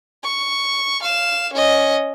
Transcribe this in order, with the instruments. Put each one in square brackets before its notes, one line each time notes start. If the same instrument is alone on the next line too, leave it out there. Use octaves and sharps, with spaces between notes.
[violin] C#6
F5 E7
C#4 D#5